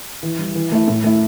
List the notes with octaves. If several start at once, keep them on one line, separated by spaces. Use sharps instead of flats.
E3
G3 E4
E3
A3 E4
A2
A3 E4